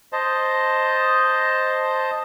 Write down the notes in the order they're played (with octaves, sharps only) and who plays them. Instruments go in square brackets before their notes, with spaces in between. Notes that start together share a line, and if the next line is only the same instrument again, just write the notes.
[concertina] C5 D#5 A5